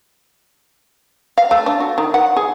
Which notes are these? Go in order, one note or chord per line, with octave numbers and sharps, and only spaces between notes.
F5
A3
D4
F#4
D#3
F#5
G#4